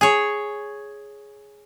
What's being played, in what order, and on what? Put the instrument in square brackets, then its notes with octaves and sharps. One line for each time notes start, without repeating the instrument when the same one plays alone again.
[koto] G#4 C#5